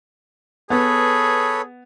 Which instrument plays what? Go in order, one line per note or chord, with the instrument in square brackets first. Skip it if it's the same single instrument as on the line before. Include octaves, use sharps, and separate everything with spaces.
[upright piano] B3 [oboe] G#4 [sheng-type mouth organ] A4 B4 C#5